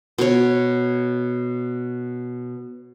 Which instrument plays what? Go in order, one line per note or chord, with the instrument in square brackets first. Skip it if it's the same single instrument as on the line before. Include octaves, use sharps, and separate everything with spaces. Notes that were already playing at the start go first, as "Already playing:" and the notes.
[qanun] B2 C#5